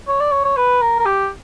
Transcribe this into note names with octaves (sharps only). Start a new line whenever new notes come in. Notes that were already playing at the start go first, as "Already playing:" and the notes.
C#5
D5
C#5
C#5
B4
A#4
A#4
G4